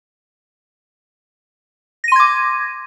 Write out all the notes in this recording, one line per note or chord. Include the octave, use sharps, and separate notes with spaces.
C6 D6 G#6 A#6 D#7